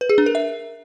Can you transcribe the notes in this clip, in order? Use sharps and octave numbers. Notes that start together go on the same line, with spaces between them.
B4
G#4
D4
A#4
E5